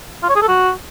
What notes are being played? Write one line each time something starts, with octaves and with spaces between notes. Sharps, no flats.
F4
C#5
G#4
A4
F#4